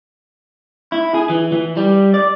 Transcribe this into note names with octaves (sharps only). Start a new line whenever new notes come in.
E4
G#4
E3
E3
G3
D5